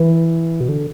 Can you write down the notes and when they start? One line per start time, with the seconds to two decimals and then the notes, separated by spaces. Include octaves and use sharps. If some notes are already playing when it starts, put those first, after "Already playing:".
Already playing: E3
0.61 B2
0.68 D3